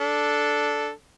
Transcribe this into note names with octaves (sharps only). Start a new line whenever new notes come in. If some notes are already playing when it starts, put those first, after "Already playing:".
D4 A4